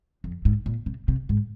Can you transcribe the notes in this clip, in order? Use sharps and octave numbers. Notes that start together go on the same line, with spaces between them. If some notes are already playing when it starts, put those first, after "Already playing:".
F2
G#2
A#2
C3
C3
G#2